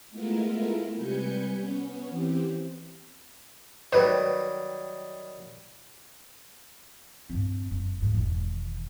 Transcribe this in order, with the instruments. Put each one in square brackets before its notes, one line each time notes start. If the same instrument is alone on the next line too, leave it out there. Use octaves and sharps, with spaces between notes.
[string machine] G#3 A3 B3 E4 F4 A#4
C3 G3 B4 G#5 G6 C#7
B3 C#4
E3 C4 G4
[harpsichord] D#3 F#3 G3 [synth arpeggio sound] B4
[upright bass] G2 C4
F#1
G#2 C#3
E1 D#3